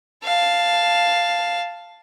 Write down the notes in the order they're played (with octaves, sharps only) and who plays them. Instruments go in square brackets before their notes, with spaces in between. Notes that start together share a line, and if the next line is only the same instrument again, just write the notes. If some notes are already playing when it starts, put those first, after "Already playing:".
[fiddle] F5 A5